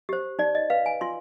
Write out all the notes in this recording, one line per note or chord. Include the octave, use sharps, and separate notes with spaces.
G4 C5
D#4 D5
D#5
B4 F5
G#5
F4 C6